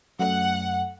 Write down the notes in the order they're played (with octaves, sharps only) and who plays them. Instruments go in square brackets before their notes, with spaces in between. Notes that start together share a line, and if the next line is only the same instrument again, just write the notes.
[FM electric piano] F#2 A3 [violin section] F#5